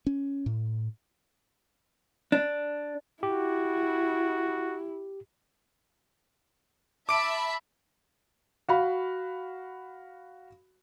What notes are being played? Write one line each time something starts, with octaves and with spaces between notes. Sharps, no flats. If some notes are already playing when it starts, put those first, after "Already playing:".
C#4
A2
D4
E4 F#4 G4
E5 A5 B5 D6 D7
F#4 F5 B5